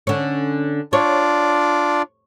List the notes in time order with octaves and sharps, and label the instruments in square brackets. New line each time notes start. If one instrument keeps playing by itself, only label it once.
[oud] D3 C#4
[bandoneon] D4 F4 D5 [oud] C#5